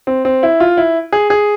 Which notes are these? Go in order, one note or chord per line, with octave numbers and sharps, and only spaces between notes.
C4
C4
E4
F4
E4
G#4
G#4